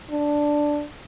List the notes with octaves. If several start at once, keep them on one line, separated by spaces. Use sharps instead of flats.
D4